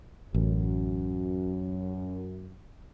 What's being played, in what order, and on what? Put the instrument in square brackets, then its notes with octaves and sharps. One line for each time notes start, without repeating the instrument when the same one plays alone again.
[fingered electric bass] A1 [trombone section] F#2